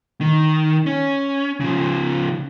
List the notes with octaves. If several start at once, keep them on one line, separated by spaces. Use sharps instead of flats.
D#3
C#4
C#3 F3